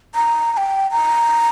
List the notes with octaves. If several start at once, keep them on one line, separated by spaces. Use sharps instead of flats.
A#5
A#5
G5
A#5